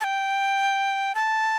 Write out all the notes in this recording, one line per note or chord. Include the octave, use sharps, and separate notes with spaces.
A5
G5
A5